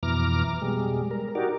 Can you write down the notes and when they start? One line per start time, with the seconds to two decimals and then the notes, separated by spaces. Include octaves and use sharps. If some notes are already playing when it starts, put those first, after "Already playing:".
0.03 F2 B2 E3 A#5 D6 F6
0.62 B2 G3 G#3
1.11 A#4
1.35 D#4 F#4 G4 A#4 D5